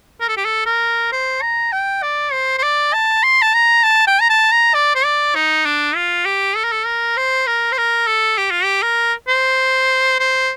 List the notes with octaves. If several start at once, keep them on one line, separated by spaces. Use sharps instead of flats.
A#4
A4
G4
A4
A#4
C5
A#5
G5
D5
C5
C5
D5
A5
C6
A5
A#5
A5
G5
A#5
A5
A#5
D5
C5
D5
D#4
D4
F4
G4
A4
A#4
A4
A#4
C5
A#4
C5
A#4
A4
G4
F4
G4
A#4
C5
C5